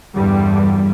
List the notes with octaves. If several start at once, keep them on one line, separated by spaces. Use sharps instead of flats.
E2 G2 D3 G3